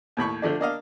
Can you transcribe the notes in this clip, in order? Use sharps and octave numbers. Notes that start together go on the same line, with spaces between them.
D#2 A2 B5 C#6
D3 F3 A3 D4
A#3 D4 D#5 F5